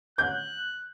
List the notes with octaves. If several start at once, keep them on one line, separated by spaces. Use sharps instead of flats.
F#6 G6